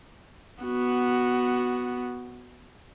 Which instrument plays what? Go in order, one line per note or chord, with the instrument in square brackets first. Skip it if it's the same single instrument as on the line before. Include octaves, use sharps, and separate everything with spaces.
[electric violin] B3 F#4